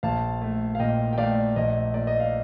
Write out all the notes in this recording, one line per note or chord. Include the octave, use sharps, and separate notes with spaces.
A#1 F5 A5
A3
F5
A#2 D#5 G5
G5
A3 D5 F5
A#1 D#5
A#2 D5
D#5
F5